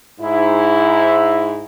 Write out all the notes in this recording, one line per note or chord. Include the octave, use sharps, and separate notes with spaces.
G#2 E4